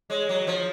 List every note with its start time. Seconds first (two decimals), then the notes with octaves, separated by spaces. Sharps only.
0.10 G#3 C#5
0.29 F#3
0.47 F3